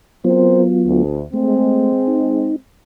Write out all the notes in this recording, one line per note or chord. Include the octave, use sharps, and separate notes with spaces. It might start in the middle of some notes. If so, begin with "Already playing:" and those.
F#3 B3 C4 F4 A#4 C5
D2
G#3 A3 C4
D#4